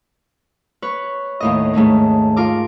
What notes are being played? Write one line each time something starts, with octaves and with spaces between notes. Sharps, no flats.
B4 C#5
D#2 A2 D#5
G#2 A3 C#4 D#4
F4 A#4 D6